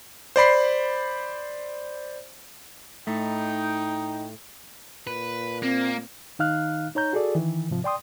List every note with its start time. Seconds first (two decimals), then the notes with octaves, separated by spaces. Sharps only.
0.36 C5 D5 B5 C7
3.07 A2 A3 D#4 G5
5.07 A#2 B4
5.63 A#3 C4
6.39 D#3 D#4 F5 F6 F#6
6.95 D#4 C#5 A#5 G6
7.13 F#4 G#4 A4 D5
7.35 D#3 E3
7.70 G#2 C3 F3
7.84 D5 G5 C6 D#6